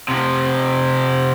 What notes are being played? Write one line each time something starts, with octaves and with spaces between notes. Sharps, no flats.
C3 F3